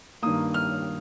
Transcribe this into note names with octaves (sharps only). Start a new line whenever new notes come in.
G2 D#3 A#3 D#6
F6